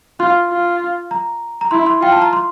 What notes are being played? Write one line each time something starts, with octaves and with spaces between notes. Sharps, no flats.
F4 C6
F4
A#5
A#5
E4 C6
C6
F4 G5
A5
A#5
C6